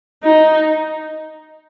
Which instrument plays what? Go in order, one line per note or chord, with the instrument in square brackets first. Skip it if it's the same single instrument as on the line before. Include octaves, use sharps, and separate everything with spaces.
[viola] D#4